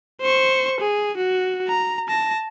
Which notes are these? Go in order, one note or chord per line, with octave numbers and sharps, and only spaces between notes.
C5 C#6
G#4
F#4
A#5
A5 A#6